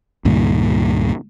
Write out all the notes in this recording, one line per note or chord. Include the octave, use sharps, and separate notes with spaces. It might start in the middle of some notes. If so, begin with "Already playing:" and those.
C#2 G2 A#2 D#3